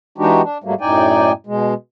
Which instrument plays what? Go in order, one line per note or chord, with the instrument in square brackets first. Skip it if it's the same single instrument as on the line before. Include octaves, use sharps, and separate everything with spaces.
[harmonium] E3 G#3 D4 D#4 F#4 G4
D4
G#2 F#3 G3 A3 A#3
F#2 A2 D#4 D5 G5 G#5
B2 G#3